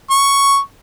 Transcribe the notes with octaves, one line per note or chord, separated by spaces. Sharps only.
C#6